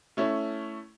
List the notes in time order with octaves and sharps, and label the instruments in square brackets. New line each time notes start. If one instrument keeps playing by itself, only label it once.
[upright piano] A3 C#4 E4